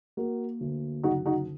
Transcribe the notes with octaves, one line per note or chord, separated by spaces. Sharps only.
A#3 F#4 A#4
D2
F#1 D#4 F#4
D#4 F#4